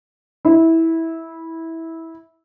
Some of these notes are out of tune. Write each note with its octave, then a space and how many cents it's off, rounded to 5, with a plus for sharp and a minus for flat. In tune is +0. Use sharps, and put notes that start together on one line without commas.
E4 -15